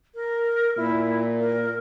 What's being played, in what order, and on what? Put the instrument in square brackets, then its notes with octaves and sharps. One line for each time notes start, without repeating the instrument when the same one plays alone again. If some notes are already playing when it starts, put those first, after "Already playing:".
[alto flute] A#4
[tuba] A#2 [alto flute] E4
[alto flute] A#4